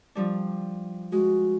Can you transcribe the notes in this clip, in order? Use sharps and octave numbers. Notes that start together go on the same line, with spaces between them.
F3 G3 D4
G#3 F#4